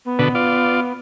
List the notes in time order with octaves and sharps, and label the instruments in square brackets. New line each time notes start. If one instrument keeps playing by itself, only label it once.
[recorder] B3
[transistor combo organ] B2 D3 B4
F4 D5